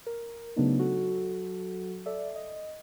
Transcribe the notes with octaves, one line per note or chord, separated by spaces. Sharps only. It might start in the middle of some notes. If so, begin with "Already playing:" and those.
A#4
C#3 F#3 A3 B3 D4 D#4
F#3 F#4 A4
A4 D5 E5
D#5